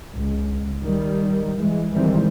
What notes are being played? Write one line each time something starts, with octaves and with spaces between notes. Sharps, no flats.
C#2
D#3 G3
E3 G#3
D#3 E3 G3 G#3 C4